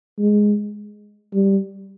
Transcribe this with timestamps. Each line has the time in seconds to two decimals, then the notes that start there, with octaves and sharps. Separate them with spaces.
0.18 G#3
1.34 G3